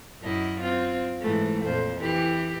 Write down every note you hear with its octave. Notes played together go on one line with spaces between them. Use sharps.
F#2 E4 D#5
C4 F4
G#2 E3 A3
F2 A#2 C5
E3 G4